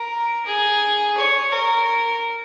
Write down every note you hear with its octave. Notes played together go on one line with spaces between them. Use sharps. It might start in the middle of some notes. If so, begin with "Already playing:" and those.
Already playing: A#4
G#4
C#5
A#4